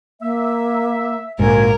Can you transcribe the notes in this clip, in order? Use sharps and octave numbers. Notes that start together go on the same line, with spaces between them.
A#3 E5
A#1 G#2 D3 A#3 F#4 A#4 G#5